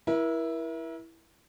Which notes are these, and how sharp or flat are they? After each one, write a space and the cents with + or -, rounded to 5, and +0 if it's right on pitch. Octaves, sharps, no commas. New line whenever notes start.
E4 +0 A#4 +40